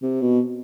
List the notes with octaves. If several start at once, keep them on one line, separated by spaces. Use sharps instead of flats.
C3
B2